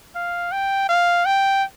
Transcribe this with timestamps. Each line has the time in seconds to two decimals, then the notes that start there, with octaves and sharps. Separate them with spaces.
0.15 F5
0.52 G5
0.89 F5
1.25 G5